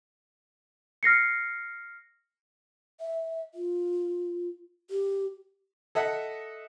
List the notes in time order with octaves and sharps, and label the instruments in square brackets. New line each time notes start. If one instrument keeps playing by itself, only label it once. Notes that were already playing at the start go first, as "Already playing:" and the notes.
[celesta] F6 A#6 C7 C#7
[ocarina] E5
F4
G4
[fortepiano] A4 D#5 E5 F#5